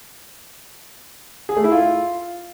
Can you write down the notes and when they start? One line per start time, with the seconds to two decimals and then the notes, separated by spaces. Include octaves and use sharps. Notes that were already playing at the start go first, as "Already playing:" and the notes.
1.49 G#4
1.57 A3
1.64 E4
1.72 F4